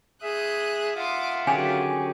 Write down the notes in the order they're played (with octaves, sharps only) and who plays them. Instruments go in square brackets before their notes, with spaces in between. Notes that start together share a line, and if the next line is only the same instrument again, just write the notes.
[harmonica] G#4 E5 [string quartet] D#6 F#6 G6
[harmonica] F4 E5 F#5 [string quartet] C6 D6 D#6
[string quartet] D3 D#3 F#3 [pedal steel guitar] C#4 G4 G#4 [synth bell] G#5